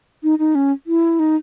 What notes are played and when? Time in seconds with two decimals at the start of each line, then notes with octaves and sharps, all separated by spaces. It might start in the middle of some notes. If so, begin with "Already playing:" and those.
0.23 D#4
0.39 D#4
0.55 C#4
0.87 E4
1.19 D#4